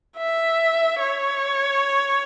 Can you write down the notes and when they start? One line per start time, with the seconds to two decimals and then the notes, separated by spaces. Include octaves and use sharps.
0.17 E5
1.01 C#5